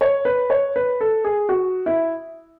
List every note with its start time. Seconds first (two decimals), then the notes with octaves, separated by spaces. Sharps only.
0.01 C#5
0.25 B4
0.50 C#5
0.76 B4
1.01 A4
1.24 G#4
1.49 F#4
1.86 E4